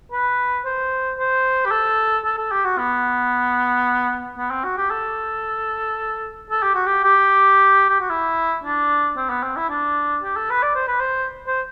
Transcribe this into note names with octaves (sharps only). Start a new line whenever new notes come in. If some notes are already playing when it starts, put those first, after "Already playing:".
B4
C5
C5
G4
A4
A4
A4
G4
F#4
B3
B3
C4
F#4
G4
A4
A4
G4
F#4
G4
G4
G4
F#4
E4
D4
C4
B3
C4
E4
D4
G4
A4
B4
D5
C5
B4
C5
C5